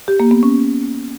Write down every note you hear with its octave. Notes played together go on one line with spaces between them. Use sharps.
G4
A#3
B3
C#4